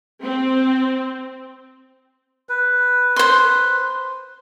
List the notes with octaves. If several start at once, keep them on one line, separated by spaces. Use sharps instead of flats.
C4
B4
C5 C6